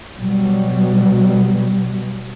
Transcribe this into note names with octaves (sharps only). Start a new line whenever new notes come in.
B2 F#3 G3